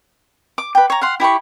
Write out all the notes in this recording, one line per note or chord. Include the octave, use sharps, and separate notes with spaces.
D6
B4 G5
C#5 A#5
F5 F#5 C6
E4 G4 B5 C#6